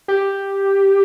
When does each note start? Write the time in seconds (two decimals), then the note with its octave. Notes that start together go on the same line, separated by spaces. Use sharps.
0.08 G4